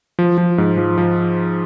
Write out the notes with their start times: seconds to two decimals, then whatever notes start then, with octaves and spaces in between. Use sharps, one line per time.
0.19 F3
0.38 F3
0.58 G#2
0.78 F3
0.98 F3